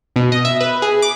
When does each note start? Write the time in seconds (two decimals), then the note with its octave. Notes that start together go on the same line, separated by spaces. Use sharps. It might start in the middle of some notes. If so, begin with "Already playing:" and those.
0.16 B2
0.32 D#5
0.45 E5
0.61 B4
0.82 G#4
1.02 D6